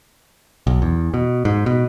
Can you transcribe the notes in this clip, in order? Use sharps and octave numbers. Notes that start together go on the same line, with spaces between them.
B1
E2
B2
G#2
B2